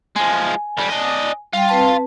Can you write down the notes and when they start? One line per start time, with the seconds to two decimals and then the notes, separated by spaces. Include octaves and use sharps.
0.16 F3 G#3 G#5
0.78 F2 G3
0.90 D4 D#5
1.53 G3 F4 G5
1.69 C4 B4 A5